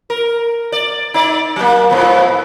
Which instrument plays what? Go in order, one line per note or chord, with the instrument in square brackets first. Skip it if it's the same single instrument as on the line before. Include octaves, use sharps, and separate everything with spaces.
[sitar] A#4
D5
D#4 D5
F#3 A#3
G#2 F3 B3